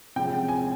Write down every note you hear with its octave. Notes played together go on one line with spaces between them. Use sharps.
C3 F3 G#3 C#4 G5
G#5